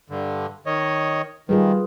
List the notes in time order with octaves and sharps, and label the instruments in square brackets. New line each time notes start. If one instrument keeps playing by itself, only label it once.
[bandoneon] G2 D3
D#3 C#5 D#5
[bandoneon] D#3 [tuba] G3 [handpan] F4 G#4 B4